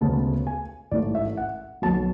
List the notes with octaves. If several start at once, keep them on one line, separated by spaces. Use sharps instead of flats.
D2 C#3 G#3 B3 A5
G#5
A1 G#2 E3 A3 D5
E5
F#5
B1 B2 F#3 A5